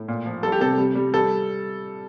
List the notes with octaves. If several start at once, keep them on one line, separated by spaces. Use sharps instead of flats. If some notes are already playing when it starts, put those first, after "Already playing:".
Already playing: A2
A#2
F3
G3 A4
G4
C3 A4
G3
G3
G3 A4